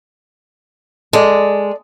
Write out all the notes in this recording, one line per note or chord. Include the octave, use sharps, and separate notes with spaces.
G#3 A4 D5